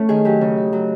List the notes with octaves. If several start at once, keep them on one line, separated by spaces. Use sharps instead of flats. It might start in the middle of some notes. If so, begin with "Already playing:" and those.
Already playing: A3 C#4
D#3 G#4
F#3 G4
C#3
D#4
F#3